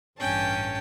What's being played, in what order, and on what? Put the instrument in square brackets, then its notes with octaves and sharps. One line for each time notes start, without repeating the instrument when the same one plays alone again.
[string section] A1 G2 C#4 [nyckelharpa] G5 A5